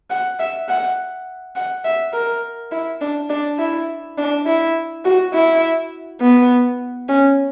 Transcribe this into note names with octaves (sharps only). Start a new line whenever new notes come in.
F#5
E5
F#5
F#5
E5
A#4
E4
D4
D4
E4
D4
E4
F#4
E4
B3
C#4